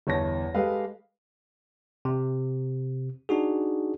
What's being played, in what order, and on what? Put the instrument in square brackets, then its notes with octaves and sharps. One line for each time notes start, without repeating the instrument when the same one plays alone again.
[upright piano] G1 E2 C#5 A5 A#6
G#3 G4 A4 B4 F5
[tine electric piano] C3
D4 D#4 F#4 G#4